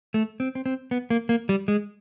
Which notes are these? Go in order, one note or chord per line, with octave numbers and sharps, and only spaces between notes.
A3
C4
C4
C4
B3
A#3
A#3
G3
G#3